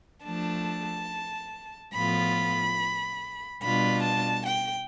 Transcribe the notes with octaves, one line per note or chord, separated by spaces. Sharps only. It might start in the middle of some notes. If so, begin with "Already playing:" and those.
F3 A3 D4 A5
A2 F3 B3 F4 B5
B2 G3 D4 F4 B5
A5
G5